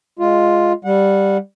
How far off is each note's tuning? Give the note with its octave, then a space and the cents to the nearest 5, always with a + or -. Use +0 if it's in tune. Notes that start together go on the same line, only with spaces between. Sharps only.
G#3 +0 F4 +0
G3 +0 F#5 -25